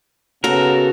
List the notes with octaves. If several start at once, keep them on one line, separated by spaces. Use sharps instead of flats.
C#3 B3 C#4 F#4 A4 A#4